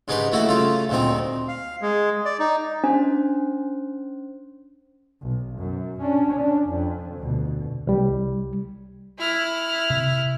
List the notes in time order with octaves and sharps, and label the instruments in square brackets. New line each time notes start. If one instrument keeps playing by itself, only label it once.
[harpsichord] G#2 C#4 D#4 G4 B4 C6
A3 A#3 E4 F#4 A4
C#3 A3 F4 A4
D2 A#2 D#3 C4 A#5
[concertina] F5
G#3
D5
D#4
[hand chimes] C#4 C5 [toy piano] D4
[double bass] B1
F#2
C#4 D4
D4
F2
D2 B2
[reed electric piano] C2 G3
[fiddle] E4 F6
[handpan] C3